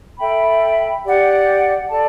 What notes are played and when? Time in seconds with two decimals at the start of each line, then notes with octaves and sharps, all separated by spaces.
0.19 A4 E5 G5 B5
1.04 G4 D5 F#5
1.90 A4 D5 A5